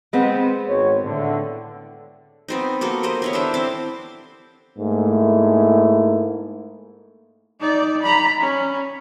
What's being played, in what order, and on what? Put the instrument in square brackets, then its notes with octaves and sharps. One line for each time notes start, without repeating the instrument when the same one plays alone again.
[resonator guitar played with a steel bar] G#3 B3 C4
[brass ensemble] G#1 C#5
A2 D3
[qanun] B3 C4 D#4
A#3 B3 F#4 A4
G4 C5 D#5
B3 E4 C#5
D4 A4 C5 E5
C4 E4 C5 D6
[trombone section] G#2 A3 A#3 E4
[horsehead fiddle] D#4 D5
A#5 B5
C#4